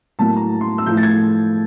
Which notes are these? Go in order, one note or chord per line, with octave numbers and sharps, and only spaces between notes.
A2 F#3 A#3 A5
A#5
C6
E6
A2 F3 A3 G6
A6
G#6